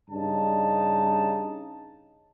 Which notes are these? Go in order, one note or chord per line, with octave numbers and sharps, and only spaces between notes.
G2 C#3 D4 D#4 A5